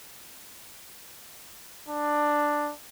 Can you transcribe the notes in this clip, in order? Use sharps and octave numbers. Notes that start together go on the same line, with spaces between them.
D4